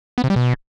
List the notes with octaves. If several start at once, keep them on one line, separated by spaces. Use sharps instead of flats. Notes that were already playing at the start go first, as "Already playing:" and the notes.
B3
C3
G3
B2